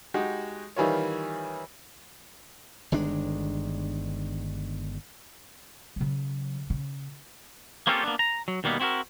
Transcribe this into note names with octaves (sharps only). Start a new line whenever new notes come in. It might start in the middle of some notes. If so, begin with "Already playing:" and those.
G#3 D#4 F#4 G4
D#3 E3 G3 F4 C#5
G1 D#3 G#3 D4
C#3 F#3
C#3
A#3 C4 C#4 F4 G4 A4
A#3 B3 D4
A#5
F#3
D#2 B2 G3 A#3 B3
C4 E4 F#4 G#4 A#4